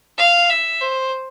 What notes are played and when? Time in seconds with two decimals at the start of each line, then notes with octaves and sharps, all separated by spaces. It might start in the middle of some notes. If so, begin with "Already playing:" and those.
0.18 F5
0.50 E5
0.81 C5